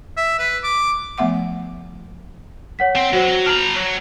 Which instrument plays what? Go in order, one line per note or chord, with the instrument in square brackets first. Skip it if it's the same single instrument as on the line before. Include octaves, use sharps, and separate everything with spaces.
[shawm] E5
B4
D6
[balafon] F3 A3 B3 E5 F#5 D6
[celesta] C#5 F#5 B6
[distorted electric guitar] C4
[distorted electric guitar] F#3 [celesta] F#4 C5
[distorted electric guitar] D4 A#5 [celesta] F6 F#7
[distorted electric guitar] F#3